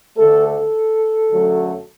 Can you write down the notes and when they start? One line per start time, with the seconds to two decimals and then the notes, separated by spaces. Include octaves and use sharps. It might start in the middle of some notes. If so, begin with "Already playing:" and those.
0.17 D2 D3 A3 A4
0.45 A4
1.30 F#2 D3 F#3 A3